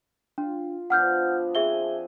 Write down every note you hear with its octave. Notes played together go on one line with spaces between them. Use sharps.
D4 F4
F3 B3 D4 F#5 F6 G6
C4 G#4 E5 G#5 G7